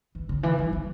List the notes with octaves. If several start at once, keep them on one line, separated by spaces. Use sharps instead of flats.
E3
C#3
E3
G3
F3